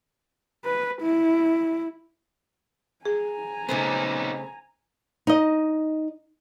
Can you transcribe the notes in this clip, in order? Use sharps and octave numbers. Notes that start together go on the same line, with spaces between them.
B4
E4
G#4 G#5 A#5
C#3 A3 B3 C4 D#4
D#4 D#5